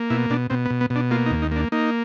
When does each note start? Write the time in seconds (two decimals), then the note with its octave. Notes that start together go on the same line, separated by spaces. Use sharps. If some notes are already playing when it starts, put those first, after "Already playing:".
Already playing: A#3
0.10 B2 E4
0.30 B2 D4
0.50 B2 C4
0.65 B3
0.70 B2
0.81 B3
0.90 B2
0.96 D4
1.11 A#3 F4
1.26 D#4
1.31 D#2
1.42 D#4
1.52 A#3 D4
1.72 A#3 D#4